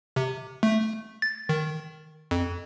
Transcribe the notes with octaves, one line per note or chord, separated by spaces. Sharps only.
C3
A3
A6
D#3
F2